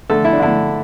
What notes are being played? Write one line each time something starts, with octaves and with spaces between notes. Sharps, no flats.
D3 A3 A4
E4
D4
D3 A3 E4